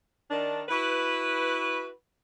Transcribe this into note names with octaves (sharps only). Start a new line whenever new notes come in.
D#3 D4
E4 F#4 B4